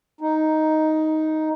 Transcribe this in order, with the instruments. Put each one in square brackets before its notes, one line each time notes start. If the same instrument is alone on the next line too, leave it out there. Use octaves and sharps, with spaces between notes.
[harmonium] D#4